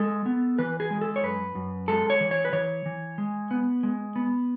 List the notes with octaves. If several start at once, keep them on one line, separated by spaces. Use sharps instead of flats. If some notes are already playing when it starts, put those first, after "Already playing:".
Already playing: G#3 A4
B3
E3 B4
G#4
G#3
A4
C#5
F#2 B4
F#2
G#3 A4
C#5
E3
C#5
B4
E3 C#5
E3
G#3
B3
G#3
B3